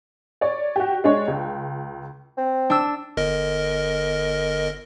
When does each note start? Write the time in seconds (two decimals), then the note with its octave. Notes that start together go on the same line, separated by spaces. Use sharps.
0.41 C#5 D5
0.76 F#4 G4
1.04 G#3 D4 C#5
1.28 C#2
2.37 C4
2.70 D4 E6
3.17 G1 A#4 D#5